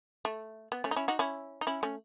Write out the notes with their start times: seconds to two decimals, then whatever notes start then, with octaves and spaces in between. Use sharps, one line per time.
0.25 A3
0.72 B3
0.84 A3 C#4
0.91 D#4
0.96 C#4 E4
1.08 D#4 F#4
1.19 C#4 E4
1.61 D#4
1.67 C#4 E4
1.83 A3 C#4